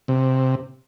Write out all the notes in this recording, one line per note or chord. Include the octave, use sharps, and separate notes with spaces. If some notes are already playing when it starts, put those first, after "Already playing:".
C3